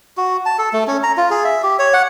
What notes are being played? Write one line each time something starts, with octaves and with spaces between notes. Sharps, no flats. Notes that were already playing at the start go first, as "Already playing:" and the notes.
F#4
A5
A4
A3
C#4
A#5
F4
G#4
E5
G4
C#5
F#5